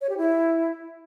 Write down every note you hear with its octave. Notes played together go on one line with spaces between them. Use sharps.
C#5
G4
E4